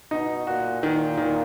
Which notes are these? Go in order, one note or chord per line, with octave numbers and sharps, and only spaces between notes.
B2 D#4
A#2 F#4
A#2 D#3
D#3